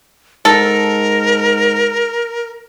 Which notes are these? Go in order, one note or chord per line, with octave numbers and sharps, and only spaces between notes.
G#2 A4 A#4